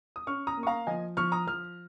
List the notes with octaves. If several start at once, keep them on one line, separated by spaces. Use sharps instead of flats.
D#6
C#4 C#6 F6
A#5 D#6
A#3
C#6
F5 A#5
F3 D#5 G#5
F3 C#6 F6
A#5 D#6
F3 F6